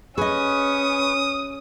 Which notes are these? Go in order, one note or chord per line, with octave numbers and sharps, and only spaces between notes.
C#4 G#4 B4 D#5 C#6 D#6